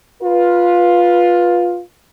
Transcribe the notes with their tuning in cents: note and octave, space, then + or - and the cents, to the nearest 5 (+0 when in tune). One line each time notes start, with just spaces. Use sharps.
F4 +10 B4 -15